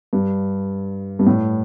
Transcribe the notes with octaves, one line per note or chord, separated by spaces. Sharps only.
G2
G2
A2